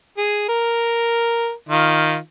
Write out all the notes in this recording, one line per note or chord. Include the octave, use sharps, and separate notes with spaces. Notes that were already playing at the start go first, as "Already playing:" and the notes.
G#4
A#4
D#3 F4